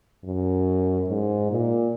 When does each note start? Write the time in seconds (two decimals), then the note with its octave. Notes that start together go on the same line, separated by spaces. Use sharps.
0.24 F#2
1.09 G#2
1.51 A#2